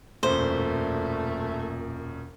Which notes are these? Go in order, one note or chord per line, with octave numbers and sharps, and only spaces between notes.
E1 F#2 A#2 A3 C5